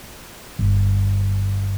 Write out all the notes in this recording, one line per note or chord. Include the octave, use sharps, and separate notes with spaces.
G1